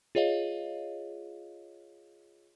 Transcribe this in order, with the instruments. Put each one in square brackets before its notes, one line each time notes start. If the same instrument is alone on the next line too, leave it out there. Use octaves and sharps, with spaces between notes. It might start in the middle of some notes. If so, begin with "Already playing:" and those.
[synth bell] F4 G#4 C#5 D#5 F5